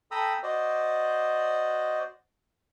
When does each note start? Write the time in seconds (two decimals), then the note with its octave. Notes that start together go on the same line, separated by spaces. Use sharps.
0.11 A4 G5 A#5 B5 D#6 E6
0.43 F#4 C5 D5 D#5